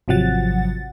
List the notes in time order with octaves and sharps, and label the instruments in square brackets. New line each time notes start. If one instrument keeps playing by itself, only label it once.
[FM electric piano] G#1 C3 F3 F#3 F#5 A6